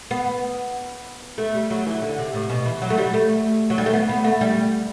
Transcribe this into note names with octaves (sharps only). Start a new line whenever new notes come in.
B3
A3
G3
F#3
E3
D3
C3
A2
B2
E3
F#3
A3
G3
A3
F#3
G3
A3
B3
B3
A3
G3